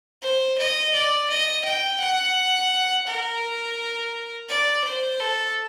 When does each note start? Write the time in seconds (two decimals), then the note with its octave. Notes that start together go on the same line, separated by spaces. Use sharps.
0.22 C5
0.58 D#5
0.94 D5
1.29 D#5
1.65 G5
2.00 F#5
3.07 A#4
4.49 D5
4.84 C5
5.20 A4